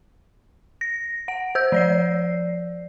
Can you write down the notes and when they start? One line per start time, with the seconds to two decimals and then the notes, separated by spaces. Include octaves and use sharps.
0.81 A#6
1.28 F#5 D7
1.55 C5 E6 G6
1.72 F3 D5 C7